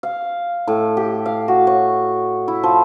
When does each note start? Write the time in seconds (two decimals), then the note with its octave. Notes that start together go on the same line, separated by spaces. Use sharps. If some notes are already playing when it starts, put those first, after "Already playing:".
0.03 F5
0.68 A2
0.97 G4
1.26 F5
1.48 F#4
1.67 C#5
2.48 E4
2.63 F3